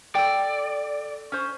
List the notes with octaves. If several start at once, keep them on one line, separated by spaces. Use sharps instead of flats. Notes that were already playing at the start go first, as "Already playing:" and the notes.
A4 D5 G5
C#4 C5